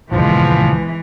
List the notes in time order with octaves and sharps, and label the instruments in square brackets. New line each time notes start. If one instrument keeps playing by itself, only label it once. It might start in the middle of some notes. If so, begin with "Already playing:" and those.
[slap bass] D#1 C#2 G2 [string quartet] E3 [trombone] F3 [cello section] G#3 B3